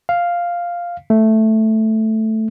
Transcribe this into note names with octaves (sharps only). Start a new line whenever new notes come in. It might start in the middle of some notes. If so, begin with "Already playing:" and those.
F5
A3